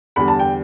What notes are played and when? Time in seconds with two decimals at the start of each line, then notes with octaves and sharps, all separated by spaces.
0.16 E2 D3 G3 B5
0.28 A5
0.39 G5